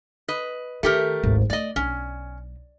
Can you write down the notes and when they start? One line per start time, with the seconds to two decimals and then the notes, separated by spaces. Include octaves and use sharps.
0.28 B4 D#5
0.83 D#3 A3 G4 A#4
1.23 D1 G#1
1.50 A3 D5 D#5
1.76 B1 C#4